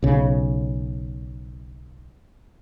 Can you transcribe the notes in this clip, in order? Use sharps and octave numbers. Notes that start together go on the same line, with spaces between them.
B1 C#3